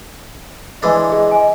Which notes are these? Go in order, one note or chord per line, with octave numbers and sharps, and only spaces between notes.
E3 G#3 D4 D#5
G#4
G#5